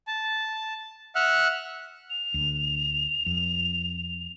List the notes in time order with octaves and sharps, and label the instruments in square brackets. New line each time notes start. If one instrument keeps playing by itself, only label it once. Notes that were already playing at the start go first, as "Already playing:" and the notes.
[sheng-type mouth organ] A5
E5 F#5 F6 F#6
[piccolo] F7
[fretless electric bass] D2
F2